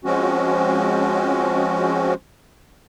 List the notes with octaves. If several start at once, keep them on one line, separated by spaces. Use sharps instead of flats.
F3 G#3 C4 C#4 F#4